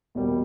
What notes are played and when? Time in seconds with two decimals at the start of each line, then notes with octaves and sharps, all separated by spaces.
0.15 E2 B2 G3 A#3